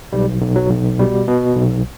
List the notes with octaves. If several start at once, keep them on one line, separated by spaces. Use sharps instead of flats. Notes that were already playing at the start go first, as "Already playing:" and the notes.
B1 G3
B1
F#3
B1
B2 G3
B2
B1